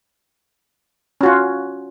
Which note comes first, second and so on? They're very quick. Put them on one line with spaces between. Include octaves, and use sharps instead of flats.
C#4 F#4 F4